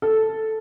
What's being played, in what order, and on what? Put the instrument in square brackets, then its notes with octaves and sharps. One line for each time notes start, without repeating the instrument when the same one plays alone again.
[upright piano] A4